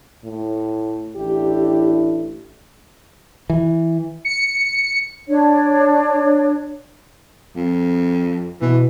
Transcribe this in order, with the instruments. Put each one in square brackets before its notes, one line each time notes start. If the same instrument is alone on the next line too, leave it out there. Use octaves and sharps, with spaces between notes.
[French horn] A2
[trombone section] A1 D4 E4 [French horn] G4
[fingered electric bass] E3
[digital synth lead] C#7
[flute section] D4 C#5
[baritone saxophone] F2
[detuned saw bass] B2 [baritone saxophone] E3